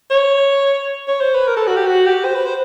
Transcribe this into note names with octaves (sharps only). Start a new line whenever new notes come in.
C#5
C#5
C5
B4
A#4
A4
F#4
G4
F#4
G4
C5
B4
C5